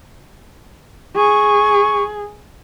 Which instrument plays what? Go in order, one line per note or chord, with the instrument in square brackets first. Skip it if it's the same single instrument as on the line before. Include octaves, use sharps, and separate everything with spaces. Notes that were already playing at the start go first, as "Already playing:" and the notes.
[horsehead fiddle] G#4 [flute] C#6